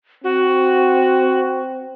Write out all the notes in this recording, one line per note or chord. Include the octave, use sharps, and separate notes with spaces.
C4 F#4